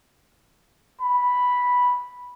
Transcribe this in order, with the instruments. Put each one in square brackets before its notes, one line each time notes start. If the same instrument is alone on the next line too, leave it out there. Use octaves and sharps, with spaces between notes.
[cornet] B5